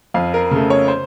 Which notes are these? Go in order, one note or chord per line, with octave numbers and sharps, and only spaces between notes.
F2 F5
A#4
C#3 A3
C#5
C5